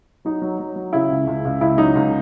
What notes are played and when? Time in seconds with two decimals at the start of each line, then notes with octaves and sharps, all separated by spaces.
0.25 F#3 D#4
0.42 F#3
0.60 F#3
0.76 F#3
0.93 C#3 E4
1.10 C#2
1.27 C#2
1.45 C#2
1.61 C#2 E4
1.78 F#3 D#4
1.95 C#2